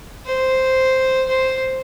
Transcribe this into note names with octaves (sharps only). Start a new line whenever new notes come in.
C5
C5